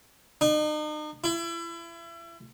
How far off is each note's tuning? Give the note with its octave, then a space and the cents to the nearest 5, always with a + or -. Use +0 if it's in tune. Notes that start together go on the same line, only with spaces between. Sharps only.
D#4 -40
E4 +35